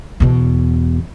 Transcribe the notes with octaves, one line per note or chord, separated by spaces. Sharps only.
E2 B2